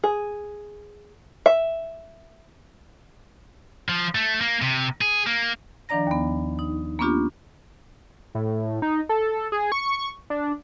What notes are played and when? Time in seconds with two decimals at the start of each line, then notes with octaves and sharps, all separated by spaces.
0.04 G#4
1.46 E5
3.89 F3
4.15 A3
4.41 A#3
4.62 C3
5.01 G#4
5.27 A#3
5.89 D#3 F3 D4 D5 A#5 A#6
6.07 D#2 B3
6.59 D#4
6.99 A#3 B3 C#4 D4 F4 G4
8.35 A2
8.82 D#4
9.09 A4
9.52 G#4
9.72 C#6
10.30 D4